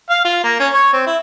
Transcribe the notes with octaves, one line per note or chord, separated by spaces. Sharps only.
F5
F4
A#3
C#4
C#5
C4
E4